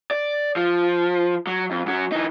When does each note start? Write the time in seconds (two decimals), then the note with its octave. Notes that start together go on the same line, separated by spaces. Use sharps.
0.11 D5
0.56 F3
1.47 F#3
1.71 F2
1.86 F#2 F#3
2.12 E3 D#4